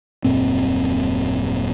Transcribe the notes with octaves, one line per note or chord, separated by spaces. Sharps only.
D#1 F#2 A#2 C4